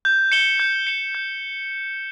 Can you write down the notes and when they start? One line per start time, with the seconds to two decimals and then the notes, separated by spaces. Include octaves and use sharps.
0.05 G6
0.32 C#7 E7 G7
0.60 G6
0.87 C#7 E7 G7
1.15 G6